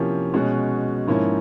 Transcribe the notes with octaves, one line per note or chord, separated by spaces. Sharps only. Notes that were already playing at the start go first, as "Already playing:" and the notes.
Already playing: C3 F3 A#3 C#4 E4
B2 G#3 C#4 F#4
G#2 F3 A#3 C#4 E4